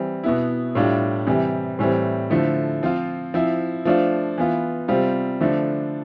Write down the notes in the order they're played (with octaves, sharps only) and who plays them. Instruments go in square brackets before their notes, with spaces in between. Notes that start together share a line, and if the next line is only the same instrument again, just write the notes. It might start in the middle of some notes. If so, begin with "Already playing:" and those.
Already playing: [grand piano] E3 G3 C4
B2 B3 E4
A2 G3 D4 F4
C3 E3 G3
A2 E3 G3 C4
D3 F3 A3 E4
F3 C4 F4
F3 C4 E4
F3 A3 D4 F4
E3 B3 F4
C3 G3 C4 F4
D3 F3 A3 D4